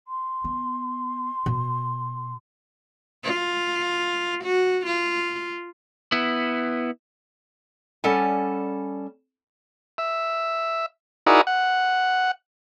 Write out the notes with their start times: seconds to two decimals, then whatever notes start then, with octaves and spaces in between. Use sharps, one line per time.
0.08 C6
0.44 B3
1.46 B2
3.24 F4
4.44 F#4
4.86 F4
6.12 B3 E4
8.04 G3 C#4 A4 D5 F#5 G#5
9.98 E5
11.27 D#4 E4 F#4 G#4 A#4 D5
11.47 F#5